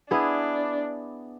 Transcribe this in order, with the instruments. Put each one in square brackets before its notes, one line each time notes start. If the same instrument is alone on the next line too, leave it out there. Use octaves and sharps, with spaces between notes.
[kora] B3 E4 G#4 [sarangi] D4